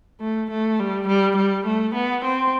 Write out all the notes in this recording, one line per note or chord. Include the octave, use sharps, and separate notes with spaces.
A3
A3
G3
G3
G3
A3
B3
C4